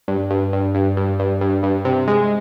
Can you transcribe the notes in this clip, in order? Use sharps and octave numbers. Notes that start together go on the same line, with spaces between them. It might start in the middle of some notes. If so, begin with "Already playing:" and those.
G2
G2
G2
G2
G2
G2
G2
G2
C3
G#3